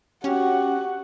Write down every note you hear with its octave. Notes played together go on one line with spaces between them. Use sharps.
C#4 F#4 G4